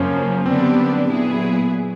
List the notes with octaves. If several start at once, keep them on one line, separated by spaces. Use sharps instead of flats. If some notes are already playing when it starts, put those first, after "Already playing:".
Already playing: F#2 C#3 F3 A#3 C#4
F#2 D3 G3 B3 C4 D4
A#2 F#3 B3 E4 G#4